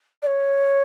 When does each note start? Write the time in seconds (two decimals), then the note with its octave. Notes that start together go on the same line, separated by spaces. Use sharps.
0.22 D5
0.26 C#5